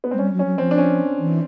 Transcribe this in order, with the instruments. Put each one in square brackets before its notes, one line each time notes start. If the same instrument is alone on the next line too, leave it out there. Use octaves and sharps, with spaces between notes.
[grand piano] B3
[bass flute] G#3 [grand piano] C4
[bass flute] G3 [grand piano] C#4
[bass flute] F#3
[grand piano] C#4
[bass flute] F#3
[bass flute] F3 [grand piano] C4
[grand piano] D4
C#4
[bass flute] E3